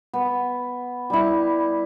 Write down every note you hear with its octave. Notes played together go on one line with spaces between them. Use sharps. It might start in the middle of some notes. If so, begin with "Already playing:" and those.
B3
G3 E4